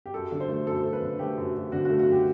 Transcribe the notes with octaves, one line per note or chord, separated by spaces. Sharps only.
G4
F#2 A4
D3
C5
A3
F#2 A4
F#2
B4
D3
A3 G4
F#2
F#2
D3 F#4
A3 F#4
F#4
F#2 G4